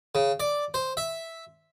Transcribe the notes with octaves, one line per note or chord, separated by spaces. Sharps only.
C#3
D5
C5
E5